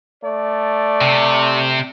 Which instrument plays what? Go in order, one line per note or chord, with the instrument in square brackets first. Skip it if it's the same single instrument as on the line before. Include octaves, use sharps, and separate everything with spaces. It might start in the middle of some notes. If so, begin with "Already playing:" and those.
[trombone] A3 [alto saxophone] D5
[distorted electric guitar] C3